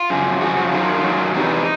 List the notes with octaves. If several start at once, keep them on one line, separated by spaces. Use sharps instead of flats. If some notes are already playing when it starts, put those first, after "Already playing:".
Already playing: F4
F#2 C#3 F3
F#2 C#3 F3 F#4
F#4
F#4
F#2 D#3 F#3 F4
F#2 D#3 F#3
E2 C3 E3 D#4